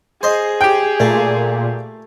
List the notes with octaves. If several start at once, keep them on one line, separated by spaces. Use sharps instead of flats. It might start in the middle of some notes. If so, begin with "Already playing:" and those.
G#4 C5 D#5
G4 G5
A#2 A3